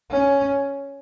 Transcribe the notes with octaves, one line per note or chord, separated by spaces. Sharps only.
C#4